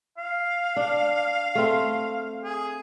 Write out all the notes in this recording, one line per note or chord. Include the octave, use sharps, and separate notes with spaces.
F5
D4
A3 C4
G#4